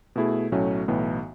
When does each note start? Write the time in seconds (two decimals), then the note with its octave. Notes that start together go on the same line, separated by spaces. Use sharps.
0.16 B2 A3 E4 G#4
0.52 B1 A2 F#3 A3 C#4
0.88 B1 A2 E3 B3